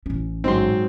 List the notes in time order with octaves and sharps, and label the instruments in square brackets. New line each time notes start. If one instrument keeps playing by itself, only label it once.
[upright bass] A1 C#4
[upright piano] G#2 F#3 [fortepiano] C4 C6